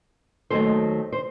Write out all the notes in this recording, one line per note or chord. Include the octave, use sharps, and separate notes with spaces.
D#2 D#3 F#3 A3 A4 C5
C5